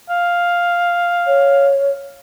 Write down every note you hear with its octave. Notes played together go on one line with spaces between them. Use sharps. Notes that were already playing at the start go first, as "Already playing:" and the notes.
F5
C#5